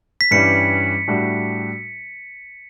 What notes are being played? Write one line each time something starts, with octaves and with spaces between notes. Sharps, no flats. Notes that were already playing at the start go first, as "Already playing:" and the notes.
B6
G2 E3 G3 C#4 C#7
A2 G3 D4 F#4